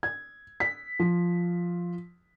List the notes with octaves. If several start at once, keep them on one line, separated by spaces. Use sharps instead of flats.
G#6
B6
F3